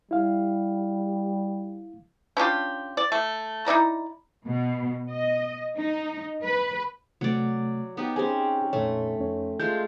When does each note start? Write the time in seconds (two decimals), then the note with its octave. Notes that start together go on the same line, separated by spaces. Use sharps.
0.11 G3 E4 F5
2.37 C#4 D4 F4 G4
2.97 D5
3.12 A3
3.66 D#4 E4 D5 A#5
4.46 B2
5.10 D#5
5.79 D#4
6.45 B4
7.21 C3 F#3 A3 D5
7.97 B3 D#4 G4
8.16 C4 C#4 G4 G#4 G#5
8.73 F2 A#2 A3 C#5
9.20 F2 C#4 C#5
9.60 G#3 A3 F4 G6